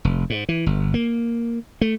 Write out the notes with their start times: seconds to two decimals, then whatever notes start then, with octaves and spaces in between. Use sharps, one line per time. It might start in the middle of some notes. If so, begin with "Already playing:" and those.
0.05 F1
0.30 G#2
0.49 E3
0.66 G1
0.94 A#3
1.81 A3